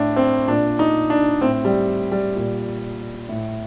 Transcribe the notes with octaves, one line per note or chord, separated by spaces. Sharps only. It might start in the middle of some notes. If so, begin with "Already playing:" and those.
Already playing: A2 D4
C4
A#2 D4
D#4
D4
A2 C4
G3
G3
A#2
A2